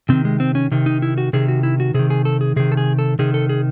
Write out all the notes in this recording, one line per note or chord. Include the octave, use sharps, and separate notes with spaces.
C3 D#3 C4
G#3
C4
C#4
C3 D#3
D#4
E4
F#4
C3 D#3 G#4
F#4
E4
F#4
C3 D#3 G#4
G#4
A4
G#4
C3 D#3 G#4
A4
G#4
A4
C3 D#3 G#4
A4
G#4